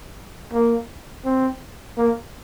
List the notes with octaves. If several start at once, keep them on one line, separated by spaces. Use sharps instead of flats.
A#3
C4
A#3